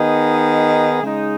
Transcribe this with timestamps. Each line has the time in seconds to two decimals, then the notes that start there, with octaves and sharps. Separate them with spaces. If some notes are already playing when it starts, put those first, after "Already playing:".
Already playing: D#3 B3 D#4 G#4
1.03 C#3 G#3 D#4